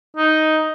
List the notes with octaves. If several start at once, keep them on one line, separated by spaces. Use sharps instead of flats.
D#4